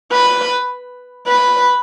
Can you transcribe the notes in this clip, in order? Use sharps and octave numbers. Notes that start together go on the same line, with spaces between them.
B4
B4